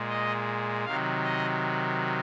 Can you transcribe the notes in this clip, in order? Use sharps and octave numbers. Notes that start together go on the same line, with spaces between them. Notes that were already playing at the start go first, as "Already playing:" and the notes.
Already playing: A#2 G#3
D#5
C3 D#3 F#3 F5
D#5